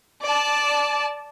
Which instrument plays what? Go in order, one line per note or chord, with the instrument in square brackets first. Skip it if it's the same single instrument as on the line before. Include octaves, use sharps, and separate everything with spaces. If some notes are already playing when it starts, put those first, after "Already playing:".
[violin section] D5 A5